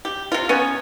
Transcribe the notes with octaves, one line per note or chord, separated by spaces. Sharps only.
G4
C3 F4
B3 C#4 C#5